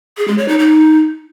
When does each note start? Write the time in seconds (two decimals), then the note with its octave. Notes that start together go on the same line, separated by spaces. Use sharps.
0.17 G#4
0.28 G#3
0.38 C#5
0.48 D#4
0.59 D#4